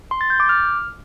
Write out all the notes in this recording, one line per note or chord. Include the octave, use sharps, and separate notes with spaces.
C6
A6
G6
D6
F6